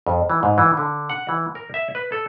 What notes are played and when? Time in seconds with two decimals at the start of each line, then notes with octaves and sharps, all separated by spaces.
0.07 F2
0.30 E3
0.43 G#2
0.58 E3
0.77 D3
1.10 F#5
1.29 E3
1.55 A#4
1.74 E5
1.95 B4
2.12 A4